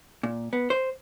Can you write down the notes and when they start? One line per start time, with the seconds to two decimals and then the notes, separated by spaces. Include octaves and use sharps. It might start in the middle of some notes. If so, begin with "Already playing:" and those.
0.23 A#2
0.53 B3
0.70 C5